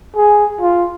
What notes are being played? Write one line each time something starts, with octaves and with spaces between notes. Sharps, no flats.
G#4
F4